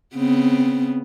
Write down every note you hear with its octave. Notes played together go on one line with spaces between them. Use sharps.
C#3 B3 C4